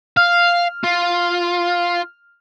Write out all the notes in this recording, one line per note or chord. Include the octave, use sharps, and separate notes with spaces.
F5 F6
F4